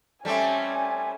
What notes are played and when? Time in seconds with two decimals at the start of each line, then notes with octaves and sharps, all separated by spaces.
0.25 G3 A3 C4 C#4 G#5